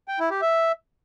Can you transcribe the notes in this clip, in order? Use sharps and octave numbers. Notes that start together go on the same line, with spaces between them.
G5
E4
G4
E5